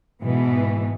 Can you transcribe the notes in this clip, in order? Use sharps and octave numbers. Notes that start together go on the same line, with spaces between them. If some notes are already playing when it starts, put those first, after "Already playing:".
G#2 B2 E3 B3